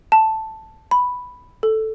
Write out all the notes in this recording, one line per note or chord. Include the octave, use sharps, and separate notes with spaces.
A5
B5
A4